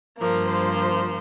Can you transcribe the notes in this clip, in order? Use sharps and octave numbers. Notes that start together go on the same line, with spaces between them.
G2 F3 A#3 A#4
C5